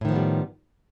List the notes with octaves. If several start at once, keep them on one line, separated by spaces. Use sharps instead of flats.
A2 D#3 F3 G3 B3